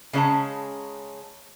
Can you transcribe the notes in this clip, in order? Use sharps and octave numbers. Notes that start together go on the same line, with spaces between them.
C#3 G#3 C#4 A4 A5 A#5